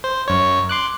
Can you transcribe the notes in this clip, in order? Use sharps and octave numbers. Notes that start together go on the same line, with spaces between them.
C5
F#2 C#5
C6 D6 F#6